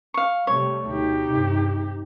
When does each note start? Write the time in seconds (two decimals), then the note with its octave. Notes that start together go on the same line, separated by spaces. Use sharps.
0.14 F5 C#6
0.47 C3 G3 A3 C#5
0.87 D2 B2 D#4 G4
1.30 G2 C3